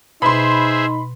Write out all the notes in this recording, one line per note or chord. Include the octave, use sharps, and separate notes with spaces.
B2 D#4 G#4 C5 E5 B5 C6